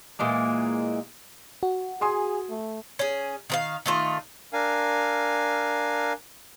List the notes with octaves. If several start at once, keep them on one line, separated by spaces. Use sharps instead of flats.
A#2 E3 G#3 A#3
F#4
G#4 G#5 C6 D#6
A3
C#4 G#4
D#3 B4 F5
D#3 A3 F4
D4 A#4 F5 G#5